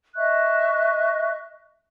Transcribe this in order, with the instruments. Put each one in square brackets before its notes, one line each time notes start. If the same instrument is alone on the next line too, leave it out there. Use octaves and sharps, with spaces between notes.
[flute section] D#5 E5 C#6 F#6